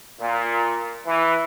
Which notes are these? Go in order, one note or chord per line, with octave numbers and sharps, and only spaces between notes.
A#2
E3